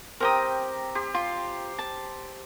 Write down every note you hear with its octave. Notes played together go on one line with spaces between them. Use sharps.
C4 G4 A#4 G5 A#5 D#6
G4 C6
F4 C6
A5